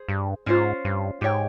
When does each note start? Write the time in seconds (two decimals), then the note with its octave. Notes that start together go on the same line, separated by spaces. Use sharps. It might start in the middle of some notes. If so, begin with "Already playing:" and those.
Already playing: G#4 C5
0.08 G2
0.46 G#2 C#4 F4 C5
0.85 G2
1.21 G#2 G4 C#5 G5